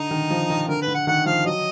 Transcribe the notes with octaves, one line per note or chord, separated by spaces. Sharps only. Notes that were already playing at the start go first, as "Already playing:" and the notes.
Already playing: D3 D#4
D#3
F3
D#3
D3 A#4
B4
D3
F#5
D#3 F#5
F3 F5
F#3 D#5